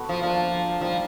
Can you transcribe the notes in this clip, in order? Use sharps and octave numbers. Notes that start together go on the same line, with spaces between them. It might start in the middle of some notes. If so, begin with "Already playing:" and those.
Already playing: A3 B3 F#4 B4
F3
F3 A#3 D4 F4
D#3 F3 G3 A#3